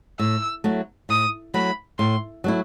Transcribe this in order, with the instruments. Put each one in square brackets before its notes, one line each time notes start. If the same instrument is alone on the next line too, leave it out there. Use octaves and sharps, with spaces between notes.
[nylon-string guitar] A2 [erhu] E6
[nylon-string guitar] F#3 A3 E4
[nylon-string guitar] A2 [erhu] D#6
[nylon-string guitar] F#3 A3 E4 [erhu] B5
[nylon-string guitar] A2 [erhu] C6
[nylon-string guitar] F#3 A3 E4